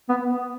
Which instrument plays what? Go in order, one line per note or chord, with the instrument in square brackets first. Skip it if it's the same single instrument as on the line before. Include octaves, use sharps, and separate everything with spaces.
[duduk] B3